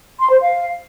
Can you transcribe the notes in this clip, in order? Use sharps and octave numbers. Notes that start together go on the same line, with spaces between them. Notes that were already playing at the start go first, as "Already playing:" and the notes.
C6
C5
F5